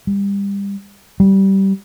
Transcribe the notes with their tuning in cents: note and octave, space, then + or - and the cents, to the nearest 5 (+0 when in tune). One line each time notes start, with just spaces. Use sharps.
G3 +30
G3 -15